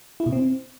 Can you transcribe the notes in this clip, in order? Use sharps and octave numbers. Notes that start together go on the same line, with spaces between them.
E4
B2
C4